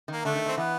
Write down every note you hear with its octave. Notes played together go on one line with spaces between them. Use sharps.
D#3 A#3
D3 A3
D#3
D#3 C4
E3 B3